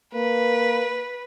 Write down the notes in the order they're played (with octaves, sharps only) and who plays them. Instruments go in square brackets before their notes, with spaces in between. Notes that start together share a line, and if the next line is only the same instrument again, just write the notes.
[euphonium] A#3 [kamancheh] B4